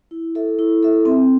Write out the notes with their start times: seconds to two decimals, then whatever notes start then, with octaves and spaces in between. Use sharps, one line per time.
0.11 E4
0.35 A4 E5
0.59 E4
0.83 A4 E5
1.05 C4